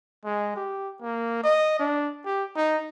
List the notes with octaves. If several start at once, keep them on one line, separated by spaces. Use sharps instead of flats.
G#3
G4
A#3
D#5
D4
G4
D#4